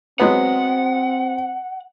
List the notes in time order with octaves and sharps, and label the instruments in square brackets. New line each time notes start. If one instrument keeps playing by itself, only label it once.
[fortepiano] F#3 G#3 B3 [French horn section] C4 [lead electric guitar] F#5